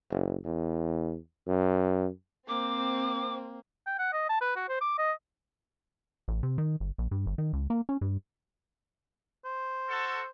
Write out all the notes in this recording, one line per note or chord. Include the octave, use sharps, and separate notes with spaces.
F#1
E2
F#2
A#3 C4 D6
G5
F#5
D#5
A5
B4
F#4
C5
D6
D#5
A1
C3
D#3
G1
A#1
G2
G1
D#3
C#2
A#3
C#4
G2
C5
F#4 A4